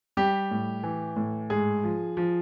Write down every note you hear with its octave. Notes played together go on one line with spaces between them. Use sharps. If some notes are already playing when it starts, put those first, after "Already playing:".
G3 G4
A2
E3
A2
G#2 G#4
F3
F3